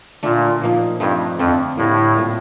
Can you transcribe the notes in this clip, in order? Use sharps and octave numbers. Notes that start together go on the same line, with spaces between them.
A#2 D3 A3 D4
A#2 F3 A#3 D#4
G2 F3 A3 C4 D#4
F2 D3 A3 C4
A2 D3 G3 A#3
A#2 A3 C4